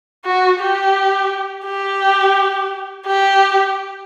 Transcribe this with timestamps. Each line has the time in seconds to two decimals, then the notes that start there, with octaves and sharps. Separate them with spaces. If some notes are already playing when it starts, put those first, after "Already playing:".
0.25 F#4
0.60 G4
1.66 G4
3.07 G4